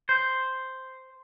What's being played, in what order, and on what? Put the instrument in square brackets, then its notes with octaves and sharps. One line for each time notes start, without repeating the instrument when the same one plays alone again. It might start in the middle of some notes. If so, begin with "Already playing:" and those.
[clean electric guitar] C5